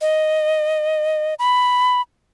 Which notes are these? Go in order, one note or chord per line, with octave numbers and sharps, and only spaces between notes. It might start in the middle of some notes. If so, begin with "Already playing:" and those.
D#5
B5